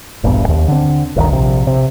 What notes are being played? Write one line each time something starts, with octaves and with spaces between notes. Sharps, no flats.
E1 A#1 G2 B3
D#2
D3 C4
G1 D2 B2 D#3
A#1 C3
C3